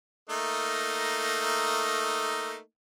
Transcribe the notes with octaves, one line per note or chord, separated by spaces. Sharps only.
A3 A#3 D#4